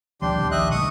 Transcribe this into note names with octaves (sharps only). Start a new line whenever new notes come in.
D2 F3 G3 D4 G4 C6
A#1 D#2
D#5 E5 F#6
C#2 D#3 C#6 D#6